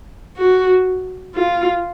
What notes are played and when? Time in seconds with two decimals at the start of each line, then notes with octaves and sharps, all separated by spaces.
0.36 F#4
1.35 F4